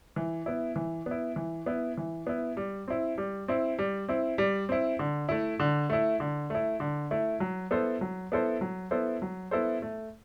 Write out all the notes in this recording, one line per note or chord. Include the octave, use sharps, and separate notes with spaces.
E3
B3 E4
E3
B3 E4
E3
B3 E4
E3
B3 E4
G3
C4 E4
G3
C4 E4
G3
C4 E4
G3
C4 E4
D3
A3 E4
D3
A3 E4
D3
A3 E4
D3
A3 E4
F#3
B3 E4 A4 C5
F#3
B3 E4 A4 C5
F#3
B3 E4 A4 C5
F#3
B3 E4 A4 C5
A3